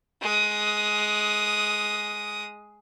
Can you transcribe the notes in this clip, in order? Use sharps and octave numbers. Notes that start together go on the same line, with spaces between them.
G#3 D#6